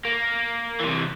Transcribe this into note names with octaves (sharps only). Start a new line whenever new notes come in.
A#3
C3 E3